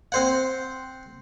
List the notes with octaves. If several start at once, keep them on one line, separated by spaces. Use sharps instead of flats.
C4 C5 F#5